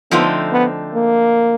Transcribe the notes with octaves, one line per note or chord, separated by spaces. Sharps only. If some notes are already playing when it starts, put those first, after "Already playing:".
D3 F3 A3 B3 C4 D#4
B3
A#3